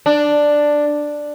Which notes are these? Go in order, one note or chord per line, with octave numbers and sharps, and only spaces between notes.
D4